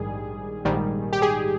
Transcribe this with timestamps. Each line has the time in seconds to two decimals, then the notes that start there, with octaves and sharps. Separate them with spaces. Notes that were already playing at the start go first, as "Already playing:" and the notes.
Already playing: A#1 G#2 D#3 G3 G#4
0.65 A#1 G#2 D#3 G3
1.13 G4
1.22 G#4